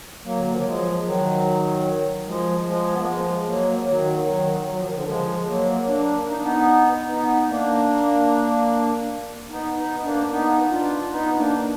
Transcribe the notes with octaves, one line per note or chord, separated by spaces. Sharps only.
F#3 A#3
D3
D#3
F3
F#3
F3 G#3
D#3 F#3
F3 G#3
F3 G#3
B3
A#3
F3 G#3
F#3 A#3
D#3 F#3
D#3 F#3
F#3
F3
D#3
D3 F3
F3 G#3
F#3 A#3
A#3 D4
D#4
D4
B3 D#4
B3 D#4
A#3 D4
B3 D#4
B3 D#4
A#3 D4
B3 D#4
D4 F4
B3 D#4
A#3 D4
D4